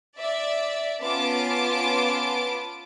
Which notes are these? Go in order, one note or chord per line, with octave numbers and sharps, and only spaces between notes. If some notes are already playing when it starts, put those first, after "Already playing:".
D5 E5
B3 C#4 F4 A5 D6 D7